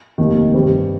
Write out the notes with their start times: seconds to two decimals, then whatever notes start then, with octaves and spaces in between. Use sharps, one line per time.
0.18 F1 D#2 D#3
0.54 G2 G3 C4